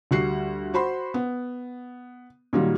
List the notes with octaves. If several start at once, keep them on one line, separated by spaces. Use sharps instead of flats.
D2 G3 F#4 F#5 C7
F#4 C5 B5 C6
B3
A#2 D#3 F#3 G3